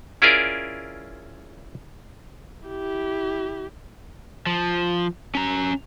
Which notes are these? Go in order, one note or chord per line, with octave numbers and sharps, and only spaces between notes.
C#4 E4 F4 G#4 A#4 D5
E4 G4
F3
C#4 A#5